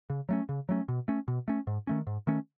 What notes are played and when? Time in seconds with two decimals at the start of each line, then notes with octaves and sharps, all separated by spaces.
0.10 C#3
0.29 F#3 A3 C#4
0.49 C#3
0.69 F#3 A3 C#4
0.88 B2
1.08 A3 C#4
1.28 B2
1.48 A3 C#4
1.67 G#2
1.87 D#3 A3 C#4
2.07 G#2
2.27 D#3 A3 C#4